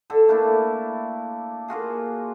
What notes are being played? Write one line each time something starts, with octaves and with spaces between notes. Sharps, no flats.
D3 A4
A3 A#3 D4 E4
A#3 F4 F#4 G#4